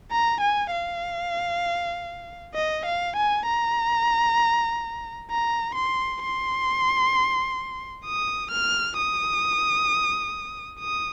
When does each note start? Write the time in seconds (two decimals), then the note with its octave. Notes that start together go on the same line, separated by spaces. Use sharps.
0.11 A#5
0.41 G#5
0.72 F5
2.55 D#5
2.86 F5
3.17 G#5
3.46 A#5
5.30 A#5
5.76 C6
6.22 C6
8.06 D#6
8.52 F6
8.97 D#6
10.80 D#6